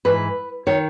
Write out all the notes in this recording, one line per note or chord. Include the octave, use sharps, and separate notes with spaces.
G#2 E3 B4
D#3 C#5